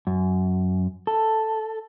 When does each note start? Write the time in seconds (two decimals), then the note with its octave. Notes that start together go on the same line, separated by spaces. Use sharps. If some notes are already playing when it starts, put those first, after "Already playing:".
0.07 F#2
1.07 A4